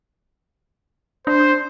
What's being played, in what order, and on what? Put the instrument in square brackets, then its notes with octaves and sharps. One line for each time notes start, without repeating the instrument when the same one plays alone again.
[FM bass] D4 [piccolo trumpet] C5